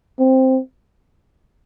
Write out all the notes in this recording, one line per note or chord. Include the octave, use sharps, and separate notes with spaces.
C4